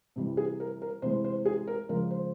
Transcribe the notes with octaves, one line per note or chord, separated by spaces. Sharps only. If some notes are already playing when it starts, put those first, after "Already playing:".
C3 E3 G3
G#4
A#4
A#4
C3 E3 G#3 C5
C5
G#4
A#4
C#3 F3 G#3 A#4
C5